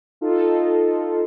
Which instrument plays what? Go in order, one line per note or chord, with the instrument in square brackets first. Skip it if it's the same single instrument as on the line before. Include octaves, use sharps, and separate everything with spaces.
[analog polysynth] D#4 F4 A4